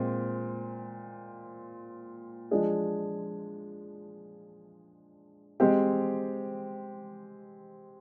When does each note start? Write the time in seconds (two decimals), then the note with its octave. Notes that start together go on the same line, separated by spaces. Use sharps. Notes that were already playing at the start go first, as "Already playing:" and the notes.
Already playing: A#2 G#3 C4
2.51 F3 G#3 D4 G#4
5.60 G#3 C4 G4